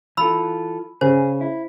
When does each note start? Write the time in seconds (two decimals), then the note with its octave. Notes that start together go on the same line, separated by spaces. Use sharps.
0.17 E3 F4 A4 B5 E6
1.01 C#3 G#4 C5
1.41 E4